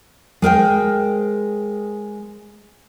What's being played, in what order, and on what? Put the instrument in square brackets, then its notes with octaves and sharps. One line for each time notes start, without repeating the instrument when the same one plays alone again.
[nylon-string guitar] G#3 A#4 C5 G5